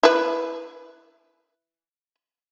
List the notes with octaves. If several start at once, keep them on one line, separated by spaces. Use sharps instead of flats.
E4 B4